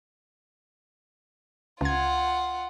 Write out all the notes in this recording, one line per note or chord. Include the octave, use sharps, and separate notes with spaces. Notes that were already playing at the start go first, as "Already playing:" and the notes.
C#2 F4 F#5 G#6